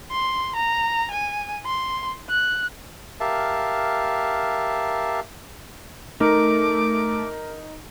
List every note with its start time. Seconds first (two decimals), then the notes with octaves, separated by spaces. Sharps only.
0.11 C6
0.56 A#5
1.11 G#5
1.66 C6
2.29 F#6
3.20 G4 A#4 E5 F5 A5
6.20 A3 D#4 A#4 D6